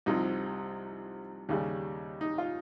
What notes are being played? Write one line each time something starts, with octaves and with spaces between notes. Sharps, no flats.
C2 C3 F3 D#4
D#2 C#3 G3
D#4
F4